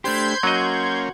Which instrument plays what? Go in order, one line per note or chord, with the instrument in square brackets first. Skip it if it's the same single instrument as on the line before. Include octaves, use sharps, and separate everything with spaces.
[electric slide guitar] A3 D4 G4 [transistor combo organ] C5 B5 [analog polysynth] C6 G6 G#6
[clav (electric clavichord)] F#3 D#5 [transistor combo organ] A#3 C#4 [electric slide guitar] F#4